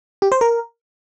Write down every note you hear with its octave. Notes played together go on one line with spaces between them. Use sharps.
G4
C5
A#4